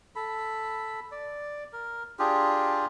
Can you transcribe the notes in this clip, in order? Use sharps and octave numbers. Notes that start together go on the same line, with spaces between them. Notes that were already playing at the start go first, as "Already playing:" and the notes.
A4 B5
D5
A#4
D4 F4 G4 G#4